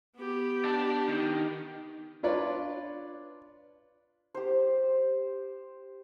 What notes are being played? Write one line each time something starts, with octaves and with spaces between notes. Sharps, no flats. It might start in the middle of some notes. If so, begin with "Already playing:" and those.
B3 G4
D4 A5
D#3
D4 F4 B4 C#5 D5
G4 C5